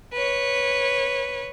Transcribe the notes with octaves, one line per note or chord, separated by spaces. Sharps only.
B4 C#5